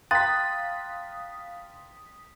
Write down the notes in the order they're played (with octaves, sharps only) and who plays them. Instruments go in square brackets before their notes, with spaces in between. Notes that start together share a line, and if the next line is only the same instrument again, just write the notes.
[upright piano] F5 C6 F#6 [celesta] G5 A#5 [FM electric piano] D#6 B6 [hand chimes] A6